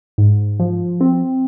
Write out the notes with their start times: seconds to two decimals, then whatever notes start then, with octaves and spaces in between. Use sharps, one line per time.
0.18 G#2
0.60 F3
1.01 C4